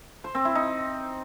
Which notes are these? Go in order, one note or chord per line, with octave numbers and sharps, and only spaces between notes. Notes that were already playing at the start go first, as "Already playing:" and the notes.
C5
C4
E4
D#4